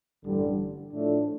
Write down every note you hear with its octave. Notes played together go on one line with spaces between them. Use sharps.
A1 G2 D3 G3
A2 F3 A3 D4